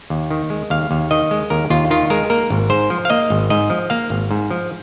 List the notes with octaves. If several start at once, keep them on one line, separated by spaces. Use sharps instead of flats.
D#2
D#3
G#3
D#2 F5
D#2
D#3 D#5
G#3
D#2 A#4
D#2 F4
D#3 F4
G#3 A#4
A#3 A#4
G#1
G#2 C5
F3
F5
A#3 D#5
G#1
G#2 D#5
F3
A#3 F5
G#1
G#2
F3